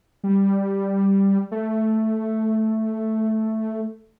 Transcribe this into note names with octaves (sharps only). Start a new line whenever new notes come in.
G3
A3